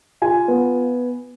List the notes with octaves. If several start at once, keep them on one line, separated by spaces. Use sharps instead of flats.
F4 G#5
B3